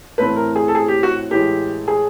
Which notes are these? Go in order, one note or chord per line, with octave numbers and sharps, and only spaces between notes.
A2 E3 A3 C4 B4
A#4
G#4
A4
G#4
G4
F#4
A2 E3 G#3 G4
G#4